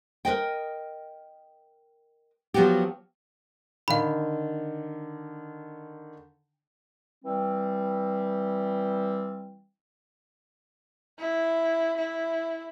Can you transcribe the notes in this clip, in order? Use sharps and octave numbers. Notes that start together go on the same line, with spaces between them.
A#4 B4 D#5 G5
F3 F#3 B3 F#4 G4
D3 D#3 F5 B5
E3 G3 C4
E4
E4